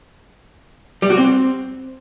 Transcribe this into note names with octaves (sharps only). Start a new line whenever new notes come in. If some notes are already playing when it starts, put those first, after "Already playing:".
G3
F#4
C4